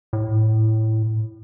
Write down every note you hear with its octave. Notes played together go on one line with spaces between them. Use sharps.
A2